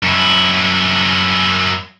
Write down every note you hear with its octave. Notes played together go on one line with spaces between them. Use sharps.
F#2 E4